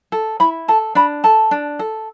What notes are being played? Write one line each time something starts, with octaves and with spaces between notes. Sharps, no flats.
A4
E4 B5
A4 A5
D4 B5
A4 A5
D4
A4